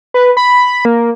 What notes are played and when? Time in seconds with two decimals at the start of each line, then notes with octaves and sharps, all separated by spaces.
0.14 B4
0.37 B5
0.85 A#3